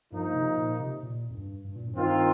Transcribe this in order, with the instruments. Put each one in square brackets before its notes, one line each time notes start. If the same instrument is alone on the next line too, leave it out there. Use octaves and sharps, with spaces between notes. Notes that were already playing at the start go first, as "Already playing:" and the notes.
[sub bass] G2 [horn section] F3 A#3 D#4
[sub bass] C3
A#2
C3
A#2
F2
G2
G2
A#2
G2
[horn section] D#3 C4 F4